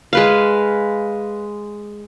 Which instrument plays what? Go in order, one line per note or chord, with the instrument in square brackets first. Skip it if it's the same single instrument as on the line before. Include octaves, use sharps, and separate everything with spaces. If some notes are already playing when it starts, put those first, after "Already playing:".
[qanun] G#3 B4 F5